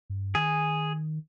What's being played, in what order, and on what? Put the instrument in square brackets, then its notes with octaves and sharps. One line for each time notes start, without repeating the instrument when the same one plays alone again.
[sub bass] G2
[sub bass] D#3 [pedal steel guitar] G#4